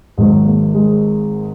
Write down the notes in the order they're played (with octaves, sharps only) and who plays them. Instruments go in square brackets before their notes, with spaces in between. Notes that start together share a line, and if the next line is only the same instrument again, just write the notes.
[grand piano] G#1 G#2 D#3 F#3 G#3
A#3
G#3